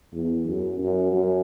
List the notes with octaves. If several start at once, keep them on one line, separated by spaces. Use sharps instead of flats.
E2
F#2
F#2
F#2